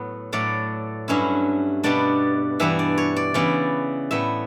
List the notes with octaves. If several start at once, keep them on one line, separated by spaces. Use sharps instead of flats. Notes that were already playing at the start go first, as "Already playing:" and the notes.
Already playing: A2 F#3 B3
A2 F#3 A3 D5
G2 F#3 C#4 E4
B2 G3 B3 D4 D5
G2 E3 G3 B3 E4 E5
D5
C#5
D5
C#3 E3 B3 E4 D5
A2 G3 B3 E5